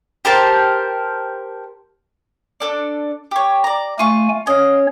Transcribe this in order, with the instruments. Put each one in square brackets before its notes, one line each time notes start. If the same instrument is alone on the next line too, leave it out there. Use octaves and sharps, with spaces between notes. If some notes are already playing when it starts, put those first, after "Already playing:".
[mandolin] G4 A#4 C5 A5
D4 A4 D5
G4 C#5
D5 A#5
[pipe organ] A3 G#5 [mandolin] F4 C#6
[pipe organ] C#4 C#5 [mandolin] D#5 F5